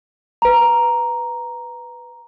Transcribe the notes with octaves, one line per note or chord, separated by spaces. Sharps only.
B4 A#5